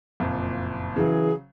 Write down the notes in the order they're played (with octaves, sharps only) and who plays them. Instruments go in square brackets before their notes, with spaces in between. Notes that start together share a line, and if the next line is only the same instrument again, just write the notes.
[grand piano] F#1 F2 A#2
[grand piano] C#3 F#3 [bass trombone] E3 [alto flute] G#4